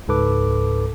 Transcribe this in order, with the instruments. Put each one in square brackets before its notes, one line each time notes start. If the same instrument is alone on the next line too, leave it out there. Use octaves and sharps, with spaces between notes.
[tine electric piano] C#2 G#2 A4 B4 D6